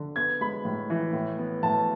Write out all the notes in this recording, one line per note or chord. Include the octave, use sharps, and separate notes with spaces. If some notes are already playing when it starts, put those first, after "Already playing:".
Already playing: D3
B3 G#6
G#3 B5
A2
E3
A2
B3
A2 A5